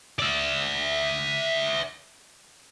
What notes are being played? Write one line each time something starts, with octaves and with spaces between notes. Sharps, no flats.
D5 E5